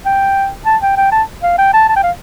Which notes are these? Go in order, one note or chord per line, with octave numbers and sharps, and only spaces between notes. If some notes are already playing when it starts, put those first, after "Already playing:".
G5
A5
G5
G5
A5
F5
G5
A5
A5
G5
F5